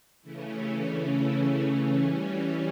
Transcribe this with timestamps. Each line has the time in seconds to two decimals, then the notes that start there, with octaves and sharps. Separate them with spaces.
0.22 C#3 E3 A3 C#4 E4
0.51 E4 G4
0.80 D4
1.10 E4
1.98 E3 G3 C#4 E4
2.27 D4 F#4